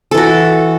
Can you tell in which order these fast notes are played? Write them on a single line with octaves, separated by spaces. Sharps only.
A4 E3 F#4